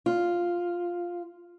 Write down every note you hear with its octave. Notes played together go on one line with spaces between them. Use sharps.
F4